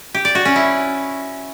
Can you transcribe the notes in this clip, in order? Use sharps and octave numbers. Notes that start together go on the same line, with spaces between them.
G4
D5
F#4
C#4
E4